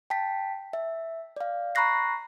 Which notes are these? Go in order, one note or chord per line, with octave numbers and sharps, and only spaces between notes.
G5 A5 B6
E5
D5 F5
A#5 B5 C#6 F#6 A#6 C7